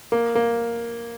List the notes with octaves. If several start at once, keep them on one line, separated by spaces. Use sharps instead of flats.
A#3
A#3